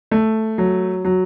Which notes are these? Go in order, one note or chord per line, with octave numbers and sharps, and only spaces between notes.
A3
F#3
F#3